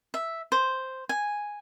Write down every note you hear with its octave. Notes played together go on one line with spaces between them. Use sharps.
E5
C5
G#5